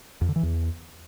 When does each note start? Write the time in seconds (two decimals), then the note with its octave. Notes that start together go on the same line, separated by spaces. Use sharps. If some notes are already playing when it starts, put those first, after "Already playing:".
0.21 F2
0.28 D3
0.36 E3
0.43 E2